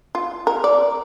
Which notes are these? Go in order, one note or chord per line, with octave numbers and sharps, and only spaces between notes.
F4
A#4
D5